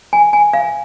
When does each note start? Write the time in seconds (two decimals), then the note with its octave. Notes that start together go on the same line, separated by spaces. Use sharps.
0.13 G#5
0.33 G#5
0.53 F5